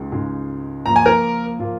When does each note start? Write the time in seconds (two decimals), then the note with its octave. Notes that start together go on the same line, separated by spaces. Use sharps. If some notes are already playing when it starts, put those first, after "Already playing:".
Already playing: C#2 C#3 G#3 D#4
0.12 C#2 C#3 G#3 D#4
0.85 A#2 F3 A#3 F4 A#5
0.96 G#5
1.05 A#4 A#5
1.59 A#2 F3 A#3 F4